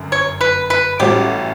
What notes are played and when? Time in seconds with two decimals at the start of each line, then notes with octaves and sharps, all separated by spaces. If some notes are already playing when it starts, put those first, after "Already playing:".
Already playing: G1 F#2
0.12 C#5
0.41 B4
0.70 B4
0.99 A1 A2 G3 C#4 F#4 G4